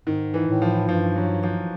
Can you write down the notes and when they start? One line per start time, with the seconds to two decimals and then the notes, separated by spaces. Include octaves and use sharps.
0.07 G#2 D#3
0.34 E3
0.48 A2
0.62 F3
0.89 G2 F3
1.16 F#3
1.44 F3